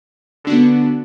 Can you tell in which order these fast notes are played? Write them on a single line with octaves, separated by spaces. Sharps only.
D3 D4 F#4 B3